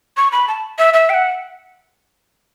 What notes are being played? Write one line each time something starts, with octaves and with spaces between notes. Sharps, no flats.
C#6
B5
A5
E5
E5
G5
F#5